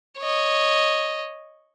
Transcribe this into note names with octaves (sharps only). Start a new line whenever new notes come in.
C#5 D#5